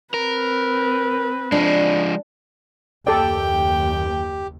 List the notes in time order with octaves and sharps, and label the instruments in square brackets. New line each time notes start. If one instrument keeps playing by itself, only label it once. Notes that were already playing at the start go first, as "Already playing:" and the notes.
[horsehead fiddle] C4 B4 [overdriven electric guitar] A#4
[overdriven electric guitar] F3 G#3 [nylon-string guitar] D4
[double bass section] F#1 D#2 [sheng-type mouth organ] G4 [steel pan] A4 D5 [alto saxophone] G5